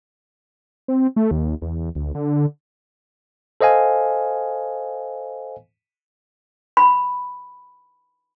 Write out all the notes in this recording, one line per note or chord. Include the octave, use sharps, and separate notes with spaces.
C4
A3
D#2
E2
D2
D3
A4 C5 D#5 F5 G#5
B5